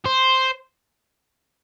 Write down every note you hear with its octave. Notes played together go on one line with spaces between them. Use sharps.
C5